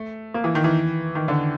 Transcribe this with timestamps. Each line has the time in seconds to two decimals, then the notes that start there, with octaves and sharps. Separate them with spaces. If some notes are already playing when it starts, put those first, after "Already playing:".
Already playing: A3
0.34 A#3
0.44 E3
0.55 D#3
0.64 E3
1.15 D#3
1.28 D3